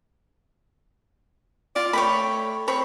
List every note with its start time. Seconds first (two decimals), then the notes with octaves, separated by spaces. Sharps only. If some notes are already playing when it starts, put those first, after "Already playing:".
1.76 F4 D5
1.93 A3 C#5 G5 B5
2.68 C4 C#5 B5